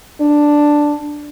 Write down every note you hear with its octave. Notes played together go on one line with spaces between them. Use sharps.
D4